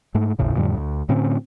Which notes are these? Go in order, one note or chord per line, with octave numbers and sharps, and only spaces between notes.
G#2 A3
G#1 D#2 A2 C#3
F2 A2 D3 G3
D2
A2 D3 C4 C#4